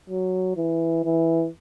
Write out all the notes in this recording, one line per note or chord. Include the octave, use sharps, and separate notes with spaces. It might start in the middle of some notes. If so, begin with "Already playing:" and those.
F#3
E3
E3